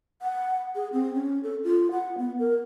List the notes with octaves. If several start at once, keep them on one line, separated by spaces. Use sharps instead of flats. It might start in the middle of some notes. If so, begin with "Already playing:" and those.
F#5
G#4
C4
C#4
A4
F4
F#5
B3
A#4